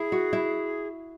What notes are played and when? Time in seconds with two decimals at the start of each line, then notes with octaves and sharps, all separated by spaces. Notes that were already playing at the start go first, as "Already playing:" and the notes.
Already playing: E4 G#4
0.12 F#4
0.33 E4